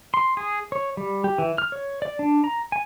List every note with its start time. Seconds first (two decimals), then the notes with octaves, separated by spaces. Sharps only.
0.14 C6
0.37 G#4
0.72 C#5
0.97 G3
1.24 G4
1.38 E3
1.58 F6
1.72 C#5
2.02 D5
2.19 D4
2.44 A#5
2.72 G#5